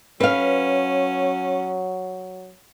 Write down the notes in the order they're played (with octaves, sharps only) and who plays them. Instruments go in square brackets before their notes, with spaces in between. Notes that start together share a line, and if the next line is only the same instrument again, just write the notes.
[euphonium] F#3 [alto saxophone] C#4 [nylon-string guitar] B4 F5